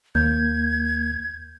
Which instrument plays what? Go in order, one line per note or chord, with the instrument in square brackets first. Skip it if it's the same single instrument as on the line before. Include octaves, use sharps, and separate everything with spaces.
[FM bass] D#2 [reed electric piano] A#3 [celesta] G6 [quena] G#6